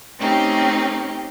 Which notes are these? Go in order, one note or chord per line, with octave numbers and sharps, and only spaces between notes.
A3 C4 C#4 D#4 G4